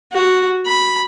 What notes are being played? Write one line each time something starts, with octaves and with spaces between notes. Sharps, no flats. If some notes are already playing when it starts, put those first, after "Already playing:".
F#4
B5